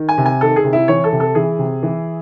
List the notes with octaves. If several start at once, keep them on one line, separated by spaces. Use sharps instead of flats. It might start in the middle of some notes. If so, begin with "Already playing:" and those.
Already playing: D#3
G#5
C3
G#5
D#3 A4
G#4
C3
E4
E3 C#5
A4
C3
A4
E3 G#4
C3
E3